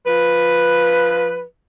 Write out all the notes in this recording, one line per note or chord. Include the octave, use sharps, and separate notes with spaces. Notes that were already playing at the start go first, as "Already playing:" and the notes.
F3 B4